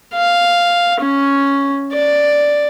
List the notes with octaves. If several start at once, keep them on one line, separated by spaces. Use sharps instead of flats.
F5
C#4
D5